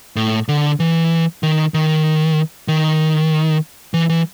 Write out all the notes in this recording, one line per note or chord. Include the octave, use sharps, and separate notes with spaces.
A2
D3
E3
D#3
D#3
D#3
E3
E3